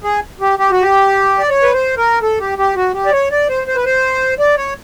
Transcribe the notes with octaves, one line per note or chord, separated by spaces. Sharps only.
G#4
G4
G4
F#4
G4
D5
C#5
B4
C5
A#4
A4
G4
G4
F#4
G4
D5
C#5
D5
C5
C5
B4
C5
D5
C#5